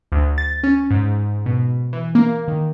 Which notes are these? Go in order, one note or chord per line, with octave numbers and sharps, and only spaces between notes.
D2
A6
C#4
G#2
B2
E3
A#3
D#3